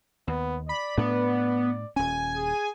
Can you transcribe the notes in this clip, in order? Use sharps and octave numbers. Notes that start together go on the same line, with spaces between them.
D#2 B3
D5 B5
A2 A3 B3 D4
D#1 C#4 G#5
G#4